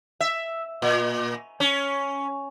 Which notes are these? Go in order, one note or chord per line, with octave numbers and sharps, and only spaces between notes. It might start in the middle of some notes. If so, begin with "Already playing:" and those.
E5
A#2
C#4